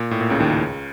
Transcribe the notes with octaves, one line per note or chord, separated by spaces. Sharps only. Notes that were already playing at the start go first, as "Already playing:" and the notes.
Already playing: A#2
A2
A#2
C#2 C#3
D#2 D#3
C#2 C#3